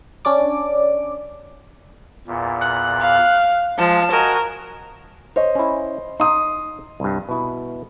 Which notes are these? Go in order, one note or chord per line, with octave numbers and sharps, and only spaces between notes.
C#4 D4 D5 D6
E2 A#2
F#6
F5
F3 G#3 A5
F#4 A#4 D#5 G#5
C5 C#5 D#5
C#4 E4
D#4 C6 D#6
C2 G2
B2 E4